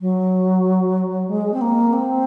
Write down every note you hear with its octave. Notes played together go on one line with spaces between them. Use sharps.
F#3
G#3
C4
A#3
C4